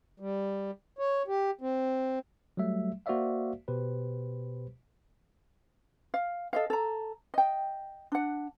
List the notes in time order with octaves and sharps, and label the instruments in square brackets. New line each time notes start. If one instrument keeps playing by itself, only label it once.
[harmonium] G3
C#5
G4
C4
[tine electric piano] F#3 G3 A3 E5
A#3 F#4 C5 D5 E5 F5
B2 G4 B4 C5
[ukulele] F5
A4 D#5 F5
A4 A#5
D#5 G5
D4 F#5